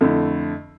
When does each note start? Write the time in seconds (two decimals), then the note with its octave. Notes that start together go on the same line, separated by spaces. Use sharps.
0.01 F2 D3 A3 E4